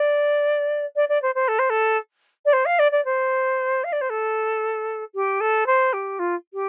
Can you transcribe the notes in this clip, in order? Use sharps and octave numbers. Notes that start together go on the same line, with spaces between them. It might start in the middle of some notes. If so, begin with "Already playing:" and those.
Already playing: D5
D5
D5
C5
C5
A4
C5
A4
D5
C5
F5
D5
D5
C5
F5
D5
C5
A4
G4
A4
C5
G4
F4
G4